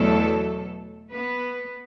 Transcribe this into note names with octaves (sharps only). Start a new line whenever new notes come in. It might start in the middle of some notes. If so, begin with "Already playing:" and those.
Already playing: E2 B2 F#3 A3 A4
B3 B4